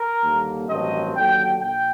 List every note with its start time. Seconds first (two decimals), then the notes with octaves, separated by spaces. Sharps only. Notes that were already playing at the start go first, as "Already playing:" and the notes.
Already playing: A#4
0.22 D#2 D3 G3 A#3
0.69 A1 G2 D#3 F#3 C4 D#5
1.16 D#2 D3 F#3 G5
1.62 A#1 G5